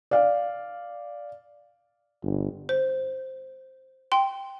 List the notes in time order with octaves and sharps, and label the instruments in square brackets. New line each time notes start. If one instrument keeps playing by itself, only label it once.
[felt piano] D5 F5
[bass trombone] G1
[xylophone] C5
G5 C6